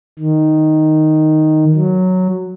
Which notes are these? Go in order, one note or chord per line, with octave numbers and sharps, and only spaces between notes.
D#3
F#3